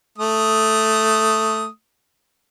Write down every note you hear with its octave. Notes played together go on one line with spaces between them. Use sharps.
A3 D#6